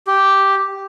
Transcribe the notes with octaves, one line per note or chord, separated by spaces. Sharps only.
G4